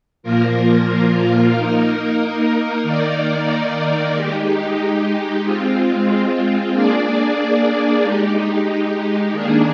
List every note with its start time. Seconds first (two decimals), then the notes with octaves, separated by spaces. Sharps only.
0.23 A#2 F3 A#3 F4 A#4
1.53 A#3 D#4 A#4
2.83 D#3 A#3 D#4 A#4 D5
4.13 G#3 D#4 G4
5.43 G#3 C4 F4
6.72 A#3 D4 G#4 D5
8.02 G#3 D#4 G4
9.32 D#3 A#3 D4 G#4